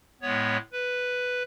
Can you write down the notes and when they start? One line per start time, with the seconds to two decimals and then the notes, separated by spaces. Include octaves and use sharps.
0.22 A2 G#3 B3 C#5
0.72 B4